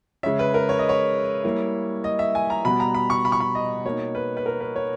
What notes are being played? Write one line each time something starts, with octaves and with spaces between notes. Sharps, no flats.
C#3 G#3 C#4 E5
B4
A#4
C#5
D#5
C#5
G3 A#3 E4
D#5
E5
G#5
A#5
B2 G3 B3 B5
A#5
B5
C#6
B5
C#6
B5
D#5
B2 A#3 D#4 C#5
B4
B4
A#4
B4
C#5